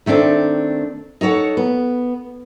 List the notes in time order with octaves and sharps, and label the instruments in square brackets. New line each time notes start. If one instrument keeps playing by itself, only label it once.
[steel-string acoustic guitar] D#3 A3 C4 D4
D#4 A4 C#5 F#5
B3